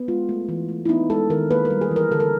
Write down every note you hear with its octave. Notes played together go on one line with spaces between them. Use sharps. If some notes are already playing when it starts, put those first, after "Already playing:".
Already playing: B3
G#3 F4
A3
E3
A3
E4
B3 D#4
G#3 A4
D#3 A#4
A#3 B4
A#4
G3
G#4
E3
A#4
D3 A4
A#4